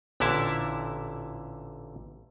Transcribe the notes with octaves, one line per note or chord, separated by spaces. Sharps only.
A1 A#2 D3 E4 E5 A5